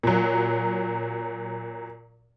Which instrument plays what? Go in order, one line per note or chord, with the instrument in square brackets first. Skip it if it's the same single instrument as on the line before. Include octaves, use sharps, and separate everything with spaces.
[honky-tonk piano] A#2 F#3